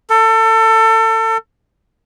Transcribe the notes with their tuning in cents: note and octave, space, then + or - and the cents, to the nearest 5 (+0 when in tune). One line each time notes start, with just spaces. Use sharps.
A4 +30